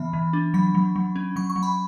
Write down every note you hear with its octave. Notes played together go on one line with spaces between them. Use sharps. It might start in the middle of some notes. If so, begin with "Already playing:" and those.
Already playing: E3 B3 B5
E3
D4
F#3 B5
F#3
F#3
C#4
F#3 C#6
C#6
F#3
B5